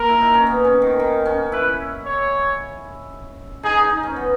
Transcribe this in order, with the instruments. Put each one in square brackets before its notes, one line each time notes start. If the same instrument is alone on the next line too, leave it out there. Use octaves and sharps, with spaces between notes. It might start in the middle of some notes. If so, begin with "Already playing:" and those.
Already playing: [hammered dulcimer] A#3 [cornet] A#4
[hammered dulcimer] E4
D#4
C#4
B3
C#4
D#3
D#3
C#4
[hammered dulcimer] E4 [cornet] B4
[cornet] C#5
[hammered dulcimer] D#4 [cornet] G#4
[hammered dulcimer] D#4
D#4
C#4
B3